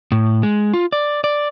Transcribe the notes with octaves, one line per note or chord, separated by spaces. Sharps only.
A2
G#3
F4
D5
D5